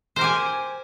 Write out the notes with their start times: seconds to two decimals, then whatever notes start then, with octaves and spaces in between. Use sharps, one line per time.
0.16 C5
0.19 A#4
0.21 G4
0.24 G#5